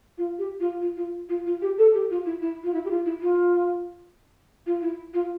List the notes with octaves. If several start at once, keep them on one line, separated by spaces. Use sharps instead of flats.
F4
G4
F4
F4
F4
F4
F4
G4
A4
G4
F4
E4
E4
F4
E4
G4
F4
E4
F4
F4
E4
F4